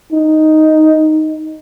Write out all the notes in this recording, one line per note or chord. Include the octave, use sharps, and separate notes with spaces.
D#4